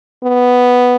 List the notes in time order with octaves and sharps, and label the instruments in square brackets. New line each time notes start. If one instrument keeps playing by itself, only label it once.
[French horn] B3